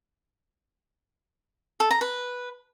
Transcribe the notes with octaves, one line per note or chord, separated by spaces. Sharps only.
A4
A#5
B4